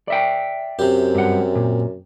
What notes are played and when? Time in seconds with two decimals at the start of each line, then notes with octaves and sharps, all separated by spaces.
0.08 D5 E5 G5
0.79 F#2 C3 G4
1.15 G2 F#5
1.55 A#2